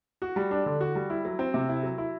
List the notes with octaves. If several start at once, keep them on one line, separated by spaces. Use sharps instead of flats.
F#4
G3
D4
D3
F#4
G3
E4
F#3
C4
C3
E4
F#3
E4